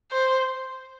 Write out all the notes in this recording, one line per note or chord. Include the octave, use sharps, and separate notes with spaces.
C5